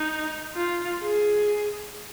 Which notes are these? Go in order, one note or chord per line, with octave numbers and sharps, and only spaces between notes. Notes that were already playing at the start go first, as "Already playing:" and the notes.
Already playing: D#4
F4
G#4